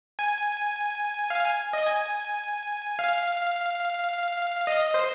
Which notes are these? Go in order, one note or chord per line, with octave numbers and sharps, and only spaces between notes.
G#5
F5
G#5
D#5
G#5
F5
D#5
C5